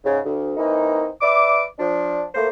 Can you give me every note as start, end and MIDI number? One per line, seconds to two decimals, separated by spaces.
0.04 0.19 44
0.04 0.19 49
0.24 0.53 38
0.57 1.06 52
0.57 1.06 58
0.57 1.06 60
0.57 1.06 63
1.21 1.63 71
1.21 1.63 74
1.21 1.63 76
1.21 1.63 86
1.78 2.22 53
1.78 2.22 62
2.35 2.47 57
2.35 2.47 58
2.35 2.47 72